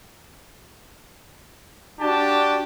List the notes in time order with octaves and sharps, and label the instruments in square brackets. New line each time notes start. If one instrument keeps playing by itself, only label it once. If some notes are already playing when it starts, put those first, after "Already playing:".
[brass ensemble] D4 F#4 A5 [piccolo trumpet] G4